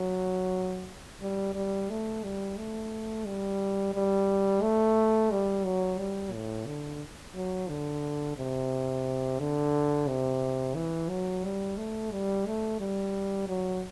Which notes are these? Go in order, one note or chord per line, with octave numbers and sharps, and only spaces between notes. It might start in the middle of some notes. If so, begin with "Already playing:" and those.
Already playing: F#3
G3
G3
A3
G3
A3
G3
G3
A3
G3
F#3
G3
A2
D3
F#3
D3
C3
D3
C3
E3
F#3
G3
A3
G3
A3
G3
F#3